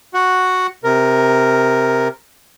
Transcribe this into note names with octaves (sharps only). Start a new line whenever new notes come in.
F#4 F#5
C3 A#4